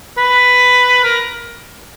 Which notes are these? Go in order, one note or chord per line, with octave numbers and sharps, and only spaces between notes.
B4
A#4